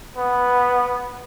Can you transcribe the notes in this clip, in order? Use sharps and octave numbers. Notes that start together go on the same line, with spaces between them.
B3